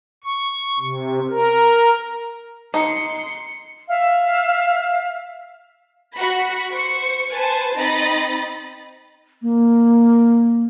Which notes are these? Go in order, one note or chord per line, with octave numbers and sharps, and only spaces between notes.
C#6
C3
A#4
D#4 C6 C#7
E5 F5
F#4 B5
C5 C#6 C#7
B4 C5 G#5 A5
C4 D#4 D#5 B5 A6
A#3